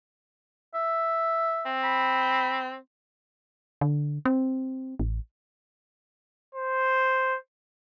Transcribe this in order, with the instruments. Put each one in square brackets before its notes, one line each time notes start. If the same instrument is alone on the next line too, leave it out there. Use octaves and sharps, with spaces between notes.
[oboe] E5
[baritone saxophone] C4
[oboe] B5
[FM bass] D3
C4
A1
[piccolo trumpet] C5